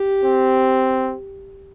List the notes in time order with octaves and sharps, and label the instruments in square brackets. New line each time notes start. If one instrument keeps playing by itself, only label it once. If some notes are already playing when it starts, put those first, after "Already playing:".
Already playing: [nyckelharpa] G4
[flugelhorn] C4